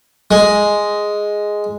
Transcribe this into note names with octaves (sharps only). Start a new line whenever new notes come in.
G#3